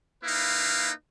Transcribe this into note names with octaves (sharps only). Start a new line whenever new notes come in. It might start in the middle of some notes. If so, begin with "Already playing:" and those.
A#3 D#4 E4 B4 F5